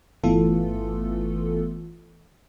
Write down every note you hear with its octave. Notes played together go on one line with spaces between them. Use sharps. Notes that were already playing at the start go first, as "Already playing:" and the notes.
G1 E3 A3 B3 F4 A4